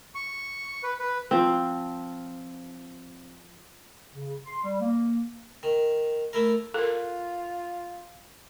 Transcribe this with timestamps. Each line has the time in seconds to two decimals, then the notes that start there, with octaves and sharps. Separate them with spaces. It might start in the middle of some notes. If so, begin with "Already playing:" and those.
0.15 C#6
0.83 B4
1.00 B4
1.31 F3 C4
4.14 C#3
4.45 C6
4.62 G3
4.81 A#3
5.63 D#3
6.33 A3 E4 A#4
6.74 F4 A4 A#4